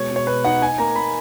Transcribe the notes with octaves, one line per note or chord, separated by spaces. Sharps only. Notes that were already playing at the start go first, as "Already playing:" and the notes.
Already playing: B2 G#3 C#5
B2
C#5
B2 B4
D#4 F#5
D#4 G#5
A#3 A#5
A#3 B5